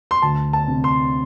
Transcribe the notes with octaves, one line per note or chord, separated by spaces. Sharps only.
C6
D2 A5
A5
C3
C6